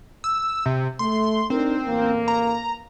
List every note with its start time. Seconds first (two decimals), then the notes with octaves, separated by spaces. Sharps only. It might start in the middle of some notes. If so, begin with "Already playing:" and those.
0.24 E6
0.66 C3
0.99 A3 C6
1.50 C4 D4 D#4 A#4
1.86 A1 A#3
2.28 A#5